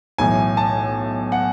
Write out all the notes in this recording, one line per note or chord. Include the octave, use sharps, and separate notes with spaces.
B1 A2 E3 G#5
A5
F#5